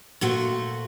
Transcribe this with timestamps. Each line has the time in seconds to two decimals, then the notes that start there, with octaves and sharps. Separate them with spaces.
0.21 A#2 A3 F#4 C5